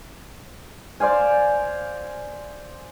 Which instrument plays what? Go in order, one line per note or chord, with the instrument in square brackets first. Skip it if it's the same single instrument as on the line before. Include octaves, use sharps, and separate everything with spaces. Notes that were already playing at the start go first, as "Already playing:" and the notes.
[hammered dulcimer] C5 D5 F5 G#5